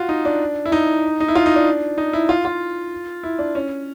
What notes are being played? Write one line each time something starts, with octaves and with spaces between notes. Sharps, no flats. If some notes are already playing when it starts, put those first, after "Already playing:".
Already playing: F4 F#4
D#4
D4
E4
D#4
D#4
E4
F4
D#4
D4
D#4
E4
F4
F4
E4
D4
C#4